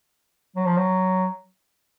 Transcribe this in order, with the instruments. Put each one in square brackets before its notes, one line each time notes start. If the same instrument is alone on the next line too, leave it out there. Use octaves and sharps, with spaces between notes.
[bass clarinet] F#3
F3
F#3